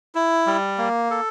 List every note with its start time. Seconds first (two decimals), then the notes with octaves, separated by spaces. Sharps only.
0.15 E4
0.46 G3
0.78 A#3
1.11 A4